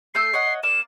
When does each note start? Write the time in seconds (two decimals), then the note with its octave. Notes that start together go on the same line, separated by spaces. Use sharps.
0.15 A3 E6 G6 C7
0.33 C#5 D#5 F#5
0.63 A#3 D5 E7